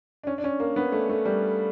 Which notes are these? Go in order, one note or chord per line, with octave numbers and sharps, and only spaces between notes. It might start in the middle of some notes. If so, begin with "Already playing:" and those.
D4
C#4
D4
C#4
A#3
B3
A3
A3
G3